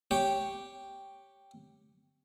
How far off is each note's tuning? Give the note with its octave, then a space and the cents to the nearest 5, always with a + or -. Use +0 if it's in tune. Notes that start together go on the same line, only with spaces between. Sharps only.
G4 +0 C#5 +0 G5 +0